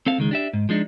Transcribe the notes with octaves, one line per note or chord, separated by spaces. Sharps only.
C4 A4 F5
C#2 D#3 G#3
D4 G4 E5
G#2
F3 G#3 D4 D#4